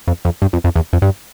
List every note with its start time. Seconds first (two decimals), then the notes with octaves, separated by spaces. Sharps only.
0.08 F2
0.25 F2
0.42 G2
0.53 F2
0.64 F2
0.76 E2
0.93 F2
1.02 G2